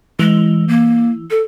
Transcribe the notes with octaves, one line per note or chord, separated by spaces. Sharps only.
E3 G#3
A#3
A4